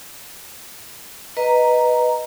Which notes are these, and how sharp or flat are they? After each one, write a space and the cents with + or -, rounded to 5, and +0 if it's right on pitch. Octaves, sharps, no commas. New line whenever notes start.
B4 +0 D#5 +0 A#5 +0